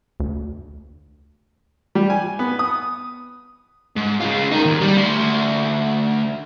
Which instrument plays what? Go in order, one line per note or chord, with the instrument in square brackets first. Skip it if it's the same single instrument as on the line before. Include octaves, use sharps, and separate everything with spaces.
[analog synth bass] D2
[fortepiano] G3
G#5
B3
D#6
[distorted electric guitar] G#2
G#3 F4
D#4 A#4
D#2
G3
D2 C6